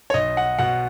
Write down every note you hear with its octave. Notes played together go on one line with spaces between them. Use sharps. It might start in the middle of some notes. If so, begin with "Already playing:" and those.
C#5
B1 D#5
F#5
B2 F#5